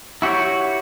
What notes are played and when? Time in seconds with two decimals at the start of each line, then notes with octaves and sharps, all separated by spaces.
0.22 E4 F#4 G4 C#5